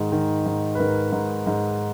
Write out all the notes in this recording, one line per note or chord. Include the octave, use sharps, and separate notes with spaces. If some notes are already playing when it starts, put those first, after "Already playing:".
Already playing: G#2 D#3 G#4
D#3
G#2
B4
G#2 A#4
G#2
G#2